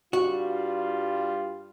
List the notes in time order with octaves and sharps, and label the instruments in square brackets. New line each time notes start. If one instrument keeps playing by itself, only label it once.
[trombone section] G2 G3 F4 [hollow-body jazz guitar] F#4